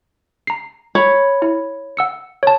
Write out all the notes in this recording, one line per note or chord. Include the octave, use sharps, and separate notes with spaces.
A#5 C7
C#5 B5
E4
F#5 E6 C#7
C#5 A5